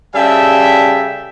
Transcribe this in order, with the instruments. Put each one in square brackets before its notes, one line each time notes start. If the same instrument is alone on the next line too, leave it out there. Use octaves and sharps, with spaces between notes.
[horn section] C#3 G3 A4 E5 G5